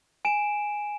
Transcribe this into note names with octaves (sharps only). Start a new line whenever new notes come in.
G#5 D7 E7